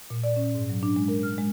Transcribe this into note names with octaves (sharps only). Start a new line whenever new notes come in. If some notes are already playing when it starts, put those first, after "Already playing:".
A#2
D5
C#4
G#2
F#3
D4
G#3
A#4
F6
G#3